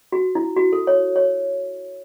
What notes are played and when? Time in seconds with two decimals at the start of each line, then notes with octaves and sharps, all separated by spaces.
0.12 F#4
0.35 E4
0.57 F#4
0.73 A4
0.87 C#5
1.16 C#5